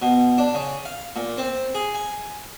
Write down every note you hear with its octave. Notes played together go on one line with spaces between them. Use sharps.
B2
D4
C#3
F5
A#2
C4
G#4
G#5